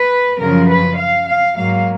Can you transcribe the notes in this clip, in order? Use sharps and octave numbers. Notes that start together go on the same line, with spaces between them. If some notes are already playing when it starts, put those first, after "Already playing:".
Already playing: B4
F#2 C#3 F3 A#4
B4
F5
F5
G#2 F#3 A#3 F5